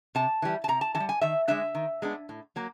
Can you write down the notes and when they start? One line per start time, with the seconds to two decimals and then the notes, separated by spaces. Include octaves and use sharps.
0.15 C3 A5
0.42 E3 G3
0.64 A5
0.68 C3 A#5
0.81 A5
0.95 E3 A5
1.00 G3
1.09 G#5
1.21 D#3 E5
1.48 G#3 B3 D4 E5
1.75 D#3
2.02 G#3 B3 D4
2.29 A2
2.56 F#3 A#3